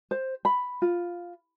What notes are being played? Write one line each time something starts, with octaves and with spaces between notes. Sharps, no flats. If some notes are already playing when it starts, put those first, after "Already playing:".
C5
B5
F4